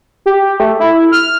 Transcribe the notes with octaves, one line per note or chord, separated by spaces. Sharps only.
G4
A3
E4
F6